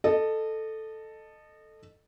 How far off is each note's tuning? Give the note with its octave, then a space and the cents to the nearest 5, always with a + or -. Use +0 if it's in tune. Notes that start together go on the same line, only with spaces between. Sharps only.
A4 +0 D#5 -25